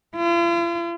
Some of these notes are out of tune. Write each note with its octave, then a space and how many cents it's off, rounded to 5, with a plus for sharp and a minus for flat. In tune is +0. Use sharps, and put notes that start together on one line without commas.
F4 -45